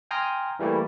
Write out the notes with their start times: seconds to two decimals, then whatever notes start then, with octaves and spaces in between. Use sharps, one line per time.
0.11 G5 G#5 A#5 C6 D#6 F6
0.59 E3 G3 A3 A#3 E4